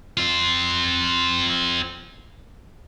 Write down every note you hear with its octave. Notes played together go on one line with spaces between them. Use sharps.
C4 F4